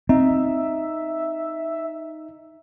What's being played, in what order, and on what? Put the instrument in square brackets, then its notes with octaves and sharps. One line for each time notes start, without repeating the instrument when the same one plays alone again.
[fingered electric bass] C4 [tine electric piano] D#4 [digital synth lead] E5